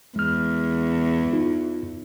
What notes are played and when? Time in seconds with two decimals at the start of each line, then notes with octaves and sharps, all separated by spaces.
0.16 E2 G#3 F6
1.33 D#4 F4